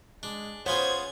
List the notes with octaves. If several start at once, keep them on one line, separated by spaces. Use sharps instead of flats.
G#3 D4
B3 F4 G#4 C5 C#5 G#6